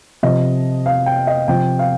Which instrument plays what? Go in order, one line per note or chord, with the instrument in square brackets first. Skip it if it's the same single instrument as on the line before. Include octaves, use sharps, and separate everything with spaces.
[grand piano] C3 F3 D#5
F5
G5
D#5
C3 F3 G5
F5